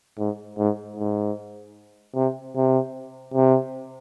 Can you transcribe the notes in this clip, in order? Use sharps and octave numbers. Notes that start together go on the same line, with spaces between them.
G#2
G#2
G#2
C3
C3
C3